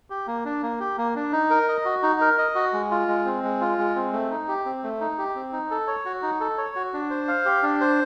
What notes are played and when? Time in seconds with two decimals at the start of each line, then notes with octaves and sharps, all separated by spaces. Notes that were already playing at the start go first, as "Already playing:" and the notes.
0.10 G4
0.27 A#3
0.45 D4
0.63 A#3
0.80 G4
0.98 A#3
1.16 D4
1.32 D#4
1.50 A#4
1.68 D#5
1.85 F#4
2.03 D#4
2.21 A#4
2.38 D#5
2.55 F#4
2.73 G#3
2.91 F4
3.08 G#3
3.25 C4
3.43 G#3
3.61 F4
3.78 G#3
3.95 C4
4.13 A3
4.31 D#4
4.48 G4
4.65 C4
4.83 A3
5.01 D#4
5.18 G4
5.35 C4
5.52 D#4
5.71 A4
5.87 C#5
6.05 F#4
6.23 D#4
6.40 A4
6.58 C#5
6.75 F#4
6.93 D4
7.10 C5
7.28 F5
7.45 G4
7.63 D4
7.81 C5